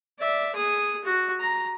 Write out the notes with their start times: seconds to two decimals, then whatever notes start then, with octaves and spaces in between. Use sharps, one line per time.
0.19 D5 E5
0.55 G#4 D#6
1.04 F#4
1.40 A#5